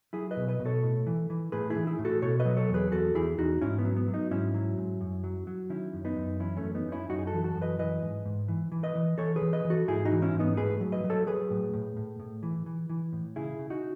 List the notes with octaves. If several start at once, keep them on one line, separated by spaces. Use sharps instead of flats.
F#3 E4 G#4
B4 D#5
B2
B4 D#5
B2
A4 C#5
A2
E3
E3
A2 G#4 B4
E4 G#4
E3
E4 G#4
A2
F#4 A4
B2 A4 C#5
B4 D#5
F#3
A4 C#5
E2
G#4 B4
E2 F#4 A4
E2 E4 G#4
E2 D#4 F#4
G#2 C#4 E4
B3
F#3
B3
F#3
B3 D#4
G#2 C#4 E4
F#3
G#2
F#2
F#3
F#3
D#3 C#4 E4
F#2
B3 D#4
F#2
E3 C#4 E4
A3 C#4
F#2
B3 D#4
F#2
C#4 E4
F#2 D#4 F#4
G#4
F#4 A4
E3
F#4 A4
F#2
B4 D#5
E3 B4 D#5
G#2
G#2
E3
E3
B4 D#5
E3
E3 A4 C#5
G#4 B4
E3
B4 D#5
E3
F#4 A4
G#2 E4 G#4
D#4 F#4
E3
C#4 E4
G#2
B3 D#4
A2 G#4 B4
F#3
B4 D#5
F#3
A4 C#5
F#3 G#4 B4
A2
A2
A2
A2
E3
E3
E3
A2
C#3 E4 G#4
C#3
D#4 F#4